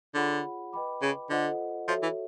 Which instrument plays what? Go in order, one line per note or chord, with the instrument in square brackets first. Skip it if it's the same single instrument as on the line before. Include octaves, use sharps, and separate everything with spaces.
[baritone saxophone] D3 [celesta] F4 G#4 C#5 F#5 B5
[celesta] B4 D#5 G5 B5 D6
[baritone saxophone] C#3
[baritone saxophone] D3 [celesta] F4 A4 C5 D#5 F#5
[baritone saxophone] F3 [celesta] F#4 A4 C#5 E5
[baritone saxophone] E3